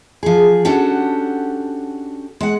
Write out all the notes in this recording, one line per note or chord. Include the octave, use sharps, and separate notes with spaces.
F3 G#4
C#4 D4 F#4 G4 A4 F#5
G#3 F#5